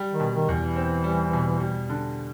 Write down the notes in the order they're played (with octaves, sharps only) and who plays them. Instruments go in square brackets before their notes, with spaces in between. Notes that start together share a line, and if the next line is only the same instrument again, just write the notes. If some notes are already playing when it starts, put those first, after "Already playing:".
Already playing: [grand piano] G3
[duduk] D#3
[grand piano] B2
[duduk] D#3
[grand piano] E2
[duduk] E3
[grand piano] C4
G3
B2
G3
D3